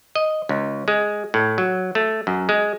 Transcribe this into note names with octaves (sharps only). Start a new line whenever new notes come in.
D#5
C#2
G#3
A2
F#3
A3
F#2
G#3